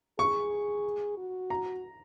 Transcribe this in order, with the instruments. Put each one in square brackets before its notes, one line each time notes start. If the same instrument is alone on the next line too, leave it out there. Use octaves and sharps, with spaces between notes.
[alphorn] G#4 [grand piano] C#6
[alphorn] F#4
[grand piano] A#5